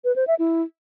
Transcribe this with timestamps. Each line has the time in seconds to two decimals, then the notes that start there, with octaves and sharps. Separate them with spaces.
0.04 B4
0.16 C5
0.27 E5
0.39 E4